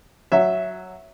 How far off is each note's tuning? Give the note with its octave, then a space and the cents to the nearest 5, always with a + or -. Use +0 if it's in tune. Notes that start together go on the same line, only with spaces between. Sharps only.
F#3 +0 E5 +0